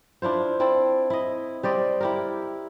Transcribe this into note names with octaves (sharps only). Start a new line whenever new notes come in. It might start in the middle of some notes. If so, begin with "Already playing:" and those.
D4 E4 F4 C5
C4 E4 A4
E4 D#5
G3 C5 D5 D#5
E4 G4 A#4